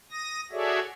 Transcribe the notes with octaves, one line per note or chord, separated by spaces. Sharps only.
D#6 A#6
F#4 G#4 A4 C#5 D5 E5